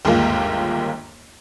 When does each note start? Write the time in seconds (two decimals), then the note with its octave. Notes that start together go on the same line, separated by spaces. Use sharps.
0.05 G1 D#2 G#2 G#3 A#3 F4